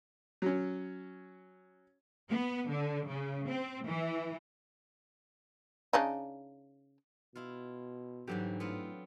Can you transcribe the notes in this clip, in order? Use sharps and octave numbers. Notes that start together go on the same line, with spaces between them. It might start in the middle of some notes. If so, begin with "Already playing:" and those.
F#3 C#4
B3
D3
C#3
C4
E3
C#3 D4 D#4
B2 E4 F4
G#2 D3 E3 F#3 G3 G4
A2 B3 C4 F4